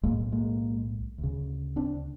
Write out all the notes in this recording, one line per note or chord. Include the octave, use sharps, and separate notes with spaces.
B1 A2 G#3 A#3
G#3 A#3
D2
C#3
C4 D4